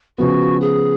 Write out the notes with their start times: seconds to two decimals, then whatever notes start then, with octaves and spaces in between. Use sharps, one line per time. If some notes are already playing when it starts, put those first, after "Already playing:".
0.18 C#3 F3 B3 F#4
0.61 G#4